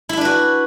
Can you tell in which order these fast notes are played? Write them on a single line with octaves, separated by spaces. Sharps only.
E4 E5 D4 B4 F#4